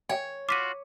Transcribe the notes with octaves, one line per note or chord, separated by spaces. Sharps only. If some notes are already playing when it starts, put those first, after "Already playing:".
C#5 E5 G5 G#5
F4 F#4 D6 B6 D#7